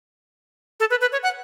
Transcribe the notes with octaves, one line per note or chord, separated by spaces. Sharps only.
A4
B4
B4
C#5
F#5